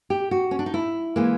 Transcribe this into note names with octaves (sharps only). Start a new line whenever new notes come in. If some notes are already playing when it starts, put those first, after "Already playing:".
G4
F#4
C#4
D4
D#4
E4
E3 G#3 A#3